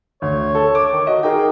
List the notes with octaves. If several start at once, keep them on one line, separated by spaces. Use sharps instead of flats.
D2 C#5
A4
D6
D#3
F#4 D#5
D#4 G#4 A#4 G5